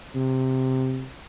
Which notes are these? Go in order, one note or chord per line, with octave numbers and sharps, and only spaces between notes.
C3